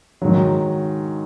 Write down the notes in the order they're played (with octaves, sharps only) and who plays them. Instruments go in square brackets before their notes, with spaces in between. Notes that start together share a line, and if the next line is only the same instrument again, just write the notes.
[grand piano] G#2 D#3 F#3